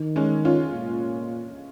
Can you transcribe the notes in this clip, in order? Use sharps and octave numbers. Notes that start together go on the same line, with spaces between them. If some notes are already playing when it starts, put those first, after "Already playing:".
Already playing: D#3
G#3 C#4
C#4 F4
A#2